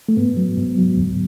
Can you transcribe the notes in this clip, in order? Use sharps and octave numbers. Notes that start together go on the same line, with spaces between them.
A3
G#2 B3
F#3
G#2
F#3
D2